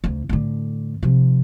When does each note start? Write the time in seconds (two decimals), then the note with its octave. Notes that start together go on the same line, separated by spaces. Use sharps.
0.04 D2 C#3
0.29 A2 D3
1.03 C3 F3